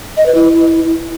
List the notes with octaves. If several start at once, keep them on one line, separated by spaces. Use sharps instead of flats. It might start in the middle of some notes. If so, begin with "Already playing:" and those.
D#5
B4
E4